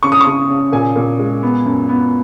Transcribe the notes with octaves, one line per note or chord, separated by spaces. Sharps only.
C#3 C#6
D#6
C#6
C#3
C#3
A#2 G#5
A#2
G#3
B3
F#2
B3